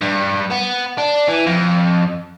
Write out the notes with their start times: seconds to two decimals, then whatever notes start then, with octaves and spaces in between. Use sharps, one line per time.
0.01 G2
0.50 B3
0.98 D4
1.28 E3
1.46 F2